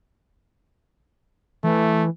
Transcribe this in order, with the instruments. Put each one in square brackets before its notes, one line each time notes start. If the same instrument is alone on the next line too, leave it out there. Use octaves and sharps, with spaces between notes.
[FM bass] E3 [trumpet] A3